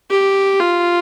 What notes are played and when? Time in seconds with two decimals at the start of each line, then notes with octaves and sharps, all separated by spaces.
0.10 G4
0.60 F4